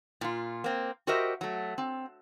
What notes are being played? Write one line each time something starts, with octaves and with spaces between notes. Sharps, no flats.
A#2 F4
A#3 C4
F#4 G4 A#4 C5 D#5 E5
F#3 A3
C4